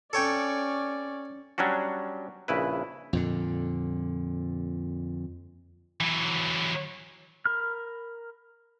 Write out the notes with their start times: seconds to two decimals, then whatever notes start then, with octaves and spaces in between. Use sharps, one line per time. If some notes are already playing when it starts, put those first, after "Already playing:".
0.13 C#4 A4 C#5 D5 G5
1.58 F#3 G3 C#4 D4 F#4
2.48 A#1 C#3 E4 B4
3.13 F2 A#2 D3
6.00 E3 F#3
7.45 A#4 B5 F6